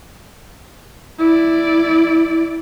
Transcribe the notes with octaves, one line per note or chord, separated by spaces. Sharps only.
E4 D5